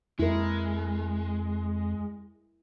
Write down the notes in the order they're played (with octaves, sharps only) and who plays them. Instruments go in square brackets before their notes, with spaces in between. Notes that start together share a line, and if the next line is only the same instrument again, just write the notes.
[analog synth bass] F2 [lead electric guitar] G#3 [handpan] E4 A#4